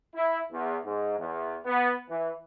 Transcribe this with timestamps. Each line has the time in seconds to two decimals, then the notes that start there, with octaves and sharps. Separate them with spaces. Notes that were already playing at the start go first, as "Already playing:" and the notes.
0.15 E4
0.51 E2
0.84 G#2
1.18 E2
1.65 B3
2.10 E3